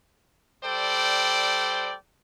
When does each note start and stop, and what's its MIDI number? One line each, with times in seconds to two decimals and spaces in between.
0.64 1.95 55
0.64 1.95 69
0.64 1.95 72
0.64 1.95 74
0.64 1.95 79